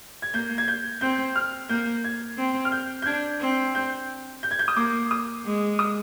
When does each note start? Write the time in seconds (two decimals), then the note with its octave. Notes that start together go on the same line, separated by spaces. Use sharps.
0.22 G#6
0.33 A#3 G6
0.58 G#6
0.68 G6
1.01 C4 G6
1.36 F6
1.69 A#3 G6
2.04 G#6
2.37 C4
2.65 F6
2.72 G6
3.02 G6
3.06 D4 G#6
3.40 C4
3.75 G6
4.43 G6
4.51 G#6
4.59 G6
4.68 D#6
4.77 A#3 D6
5.11 D#6
5.45 G#3
5.79 D#6